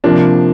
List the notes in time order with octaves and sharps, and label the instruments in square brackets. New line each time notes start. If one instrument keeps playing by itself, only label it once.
[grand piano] C3 A#3 D4 [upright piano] F3